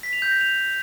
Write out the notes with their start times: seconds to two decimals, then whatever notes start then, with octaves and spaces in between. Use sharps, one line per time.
0.03 B6
0.13 F7
0.22 G6
0.32 A#6
0.41 F7